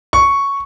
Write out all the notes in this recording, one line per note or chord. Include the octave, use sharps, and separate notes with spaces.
C#6